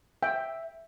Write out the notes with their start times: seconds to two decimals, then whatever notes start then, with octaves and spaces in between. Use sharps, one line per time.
0.23 E5 G5